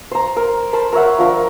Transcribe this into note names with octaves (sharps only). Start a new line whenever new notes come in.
C5 A#5
A#4
A#4 C5 A5 B5
A#4 C#5 E5 F#5
F3 D4 A#4